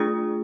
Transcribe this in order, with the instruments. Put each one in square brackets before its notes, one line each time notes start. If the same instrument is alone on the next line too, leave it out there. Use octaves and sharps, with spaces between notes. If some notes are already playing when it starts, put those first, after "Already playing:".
Already playing: [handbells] A3 D4 F4 G#4 D#6